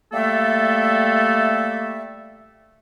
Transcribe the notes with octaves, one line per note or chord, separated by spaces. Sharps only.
G3 A3 A#3 A4 E5